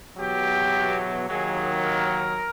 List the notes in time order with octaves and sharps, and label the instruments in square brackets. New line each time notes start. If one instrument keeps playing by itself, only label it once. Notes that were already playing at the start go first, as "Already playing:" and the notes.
[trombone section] E2 B2 F#3 G4
D#2 D#3 F#3 G#4
A#4